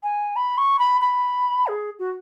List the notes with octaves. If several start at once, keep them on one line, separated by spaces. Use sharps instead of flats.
G#5
B5
C#6
B5
B5
G#4
F#4